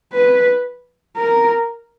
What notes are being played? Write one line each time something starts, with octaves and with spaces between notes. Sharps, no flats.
B4
A#4